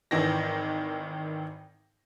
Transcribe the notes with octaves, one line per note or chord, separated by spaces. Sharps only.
G#1 D#3 E3 A#6